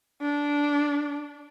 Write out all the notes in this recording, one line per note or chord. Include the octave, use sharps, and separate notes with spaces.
D4